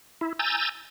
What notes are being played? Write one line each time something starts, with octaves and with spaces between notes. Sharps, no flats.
E4
G#5 A#5 E6 G6 A6